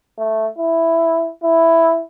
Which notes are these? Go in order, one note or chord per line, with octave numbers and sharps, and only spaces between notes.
A3
E4
E4